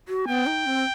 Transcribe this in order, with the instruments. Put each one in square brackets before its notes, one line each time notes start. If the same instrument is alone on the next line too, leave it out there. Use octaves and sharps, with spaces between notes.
[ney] F#4
[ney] B3 [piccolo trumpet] G5
[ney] D#4
C4